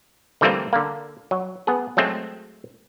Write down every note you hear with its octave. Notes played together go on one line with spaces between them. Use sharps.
D3 E3 G3 A3 A#3 C4
D3 A#3
F#3
B3 G#4
F#3 G#3 A3 C4